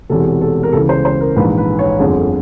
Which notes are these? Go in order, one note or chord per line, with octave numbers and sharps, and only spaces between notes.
E1 E2 C3 A4
A4
A#4
C#2 C#3 E3 A4
C5
C5
A#4
A#1 G#2 E3 B4
B4
C#5
G1 F2 D3 G#4